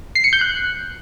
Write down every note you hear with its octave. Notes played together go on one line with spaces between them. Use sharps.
C7
C#7
G6
F#6